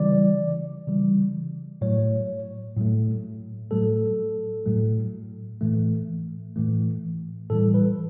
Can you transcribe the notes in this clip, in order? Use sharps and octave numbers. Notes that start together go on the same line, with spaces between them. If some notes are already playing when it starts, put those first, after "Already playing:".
Already playing: C#3 E3 G3 D5
C#3 E3 G3
A2 F#3 A3 C#5
A2 F#3 A3
A2 F#3 A3 A4
A2 F#3 A3
A2 E3 A3
A2 E3 A3
A2 E3 G3 A4
B4